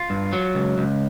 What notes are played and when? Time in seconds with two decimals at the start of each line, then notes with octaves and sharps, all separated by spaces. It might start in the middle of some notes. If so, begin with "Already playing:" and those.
Already playing: F4
0.10 G2
0.33 F#3
0.55 C#2
0.78 C#2